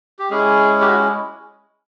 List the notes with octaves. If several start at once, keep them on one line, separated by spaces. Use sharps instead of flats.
G4
G#3 C#4 E4 G#4
G4
F#4